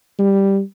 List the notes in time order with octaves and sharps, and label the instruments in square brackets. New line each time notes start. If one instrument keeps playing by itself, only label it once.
[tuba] G3